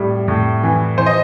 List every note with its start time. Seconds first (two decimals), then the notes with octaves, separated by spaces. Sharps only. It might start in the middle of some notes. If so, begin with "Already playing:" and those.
Already playing: A2 G3
0.28 A2
0.63 E3
0.98 E3 C5
1.06 D#5